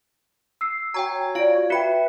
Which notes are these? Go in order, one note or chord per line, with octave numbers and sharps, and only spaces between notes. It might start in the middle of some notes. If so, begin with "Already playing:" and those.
E6 C7
F#4 C#5 G5 G#5 A#5
F4 D5 F5 D7
F#4 B4 E5 G5 B5 C#7